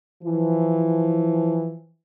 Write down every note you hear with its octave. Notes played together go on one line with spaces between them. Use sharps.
E3 F3